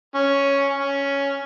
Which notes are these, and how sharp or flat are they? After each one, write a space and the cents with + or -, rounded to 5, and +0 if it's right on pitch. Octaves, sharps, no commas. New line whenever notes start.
C#4 +5
C#4 +5